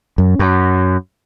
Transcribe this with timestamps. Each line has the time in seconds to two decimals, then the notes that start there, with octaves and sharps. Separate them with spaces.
0.18 F#2
0.39 F#2